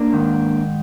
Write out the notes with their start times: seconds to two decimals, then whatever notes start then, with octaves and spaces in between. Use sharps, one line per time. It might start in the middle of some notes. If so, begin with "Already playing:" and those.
Already playing: A#3 D4
0.13 G#2 D#3